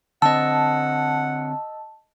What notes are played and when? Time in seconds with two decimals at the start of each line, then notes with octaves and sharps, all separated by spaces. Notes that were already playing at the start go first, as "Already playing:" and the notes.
0.22 D3 C4 D#5 F#5 A5 E6